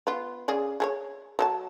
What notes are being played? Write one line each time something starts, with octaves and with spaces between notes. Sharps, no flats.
B3 F4
C#3 G#4 D5
G#4 A4 C#5
F#3 A4 A5